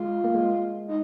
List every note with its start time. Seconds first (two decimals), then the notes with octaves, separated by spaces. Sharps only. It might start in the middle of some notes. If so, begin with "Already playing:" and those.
Already playing: G#3 F4
0.24 A#3
0.35 G#3
0.88 D#4